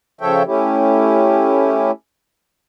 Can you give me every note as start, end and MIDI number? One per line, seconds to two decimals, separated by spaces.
0.21 0.43 49
0.21 0.43 53
0.21 0.43 69
0.21 0.43 73
0.21 0.43 76
0.21 0.43 79
0.46 1.91 57
0.46 1.91 61
0.46 1.91 64
0.46 1.91 67